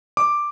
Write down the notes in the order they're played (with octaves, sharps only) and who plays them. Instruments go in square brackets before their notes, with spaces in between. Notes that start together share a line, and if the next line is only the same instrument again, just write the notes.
[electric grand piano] D6